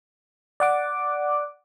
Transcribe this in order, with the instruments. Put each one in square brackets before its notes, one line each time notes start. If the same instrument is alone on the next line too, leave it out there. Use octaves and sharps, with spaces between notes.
[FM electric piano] D5 F#5 D6